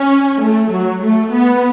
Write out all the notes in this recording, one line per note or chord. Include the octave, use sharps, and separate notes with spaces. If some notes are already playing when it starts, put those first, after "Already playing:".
Already playing: C#4
A3
F#3
A3
B3